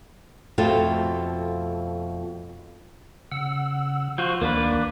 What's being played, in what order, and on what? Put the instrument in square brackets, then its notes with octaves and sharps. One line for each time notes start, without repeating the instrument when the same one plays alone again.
[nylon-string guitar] F2 B2 A3 C4 F4 A4
[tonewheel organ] C#3 F#5 E6
[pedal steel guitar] F3 F4 F#4 [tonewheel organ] C5 C6 C#6
[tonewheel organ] D2 D#3 D6 [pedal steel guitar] A#3 D4 B4